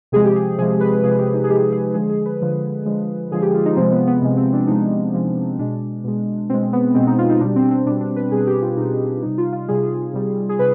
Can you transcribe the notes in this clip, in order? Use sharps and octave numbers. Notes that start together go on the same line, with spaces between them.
C3 F3 G#3 G#4
G4
G#4
C3 F3 G#3 G#4
B4
C3 F3 G#3 G#4
G4
D#4
G#4
C3 F3 G#3 G4
G#4
D3 F3 G#3 G#4
G#4
B4
D3 F3 G#3
D3 F3 G#3
D3 F3 G#3 G#4
G4
F4
D#4
C3 F3 G#3 C4
B3
B3
C3 F3 G#3 B3
C4
D4
C3 F3 G#3 D#4
C3 F3 G#3
B2 G#3 D4
B2 G#3
B2 G#3 C4
B3
B2 G#3 C4
D#4
F4
D#4
B2 G3 D4
C4
C4
B2 G3 D4
D4
B4
B2 G3 G#4
G4
F4
B2 G3 D#4
C3 G3 D#4
F4
F4
C3 G3 G#4
C3 G3
G#4
C3 B4